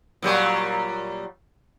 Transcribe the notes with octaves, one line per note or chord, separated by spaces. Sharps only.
A#2 F#3 G3